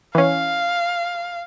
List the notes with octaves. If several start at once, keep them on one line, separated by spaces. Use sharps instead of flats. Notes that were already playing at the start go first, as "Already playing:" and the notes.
E3 C#4 F5